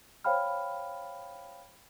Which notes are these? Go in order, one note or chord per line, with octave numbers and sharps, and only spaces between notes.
C5 C#5 F5 G5 B5 F6